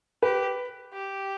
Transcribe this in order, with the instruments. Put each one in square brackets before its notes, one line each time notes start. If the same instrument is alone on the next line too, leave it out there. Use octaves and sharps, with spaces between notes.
[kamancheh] G4 [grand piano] B4
[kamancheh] G4